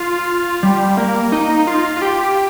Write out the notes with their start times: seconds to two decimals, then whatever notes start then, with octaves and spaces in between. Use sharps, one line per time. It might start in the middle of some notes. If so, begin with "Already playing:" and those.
Already playing: F4
0.63 G3
0.97 A#3
1.32 D#4
1.67 F4
1.97 F4
2.02 G4